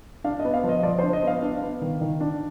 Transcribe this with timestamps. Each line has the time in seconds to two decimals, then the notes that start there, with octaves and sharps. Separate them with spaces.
0.24 D4 F5
0.39 D#5
0.45 B3
0.54 F5
0.64 F3
0.69 D#5
0.83 F3 D5
0.99 D4 C5
1.13 D#5
1.23 B3 F5
1.42 D4
1.62 B3
1.81 D#3
2.01 D#3
2.21 D4